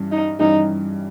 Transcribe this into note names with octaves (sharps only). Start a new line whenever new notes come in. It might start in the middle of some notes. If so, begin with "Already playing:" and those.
Already playing: G2 E3 G3 C#4
D#4
G2 E3 G3 C#4 D#4 G4